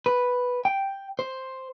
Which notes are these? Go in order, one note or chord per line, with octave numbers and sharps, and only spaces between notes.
B4
G5
C5